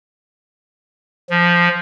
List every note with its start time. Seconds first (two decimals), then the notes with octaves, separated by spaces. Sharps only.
1.30 F3